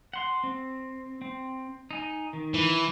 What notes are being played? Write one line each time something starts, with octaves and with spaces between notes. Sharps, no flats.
F#5 C6
C4
C4
D#4 G#5
D#3
E3